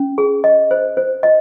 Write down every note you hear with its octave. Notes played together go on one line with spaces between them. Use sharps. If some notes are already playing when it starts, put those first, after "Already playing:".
Already playing: C#4
G#4
D#5
C5
C5
D#5